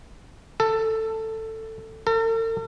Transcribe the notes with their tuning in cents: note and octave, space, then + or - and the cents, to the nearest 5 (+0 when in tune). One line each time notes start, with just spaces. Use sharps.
A4 +10
A4 +45